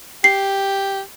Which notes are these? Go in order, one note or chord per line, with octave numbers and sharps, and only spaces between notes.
G4 C7